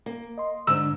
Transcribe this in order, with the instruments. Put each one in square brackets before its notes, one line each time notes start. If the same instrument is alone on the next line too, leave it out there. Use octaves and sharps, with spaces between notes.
[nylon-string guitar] A#3
[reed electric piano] D#5 C6
[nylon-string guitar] G#2 [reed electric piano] D3 D4 [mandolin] E6